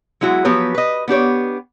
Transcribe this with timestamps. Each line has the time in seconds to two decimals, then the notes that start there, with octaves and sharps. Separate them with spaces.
0.21 F#3 G#3 E4 F#4
0.45 F3 F#3 B3 G4 B4 C#5
0.75 B4 D#5
1.08 B3 D4 G4 C#5